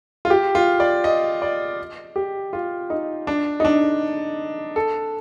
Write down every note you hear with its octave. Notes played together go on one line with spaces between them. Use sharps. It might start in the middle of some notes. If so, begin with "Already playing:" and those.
F4
G4
F4
D5
D#5
D5
G4
F4
D#4
D4
D#4
D4
A4